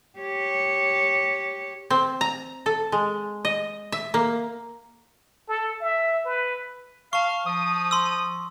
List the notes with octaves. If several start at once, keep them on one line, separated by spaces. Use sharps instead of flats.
G4 C#5
C4
A#5
A4
G#3
D#5
E5
A#3
A4
E5
B4
F5 A5 C#6
F3 D#6
C6 E6